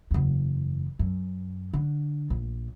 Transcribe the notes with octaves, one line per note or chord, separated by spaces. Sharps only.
F#1 E2
F#2
D3
A#1